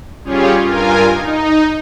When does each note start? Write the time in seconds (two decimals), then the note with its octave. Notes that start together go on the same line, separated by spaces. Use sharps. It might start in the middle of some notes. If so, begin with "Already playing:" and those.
0.24 G3 C#4 F4 G4 G#4 C#5
0.62 G2 F4 A#4 G#5
1.11 D#4